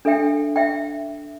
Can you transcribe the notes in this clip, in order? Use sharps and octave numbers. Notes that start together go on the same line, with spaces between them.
D4 A4 E5 G5
E5 G5